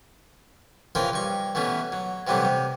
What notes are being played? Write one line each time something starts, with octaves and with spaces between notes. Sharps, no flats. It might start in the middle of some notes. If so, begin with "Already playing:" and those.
C#3 E3 F3 F4 A#4 G5
G2 C#6
B2 E3 A3 C#4
F#3
G2 C3 E3 F#3 G3 A3
C3